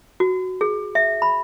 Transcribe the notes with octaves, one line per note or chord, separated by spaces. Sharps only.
F#4
G#4
E5
B5